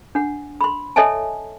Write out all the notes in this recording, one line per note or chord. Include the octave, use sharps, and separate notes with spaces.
D4 F#5
B5 C6
A4 C#5 D#5 E5 G#5 A5